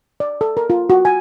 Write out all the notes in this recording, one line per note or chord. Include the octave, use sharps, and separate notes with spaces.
D5
A4
A#4
F4
F#4
G#5